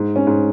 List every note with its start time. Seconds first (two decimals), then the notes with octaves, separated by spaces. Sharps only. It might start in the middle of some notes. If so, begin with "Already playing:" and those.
Already playing: G#2
0.16 C#4
0.27 G#2